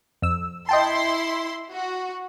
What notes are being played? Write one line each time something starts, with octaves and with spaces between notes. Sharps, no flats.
F2 E6
E4 D#5 G5 A5 C6
F#4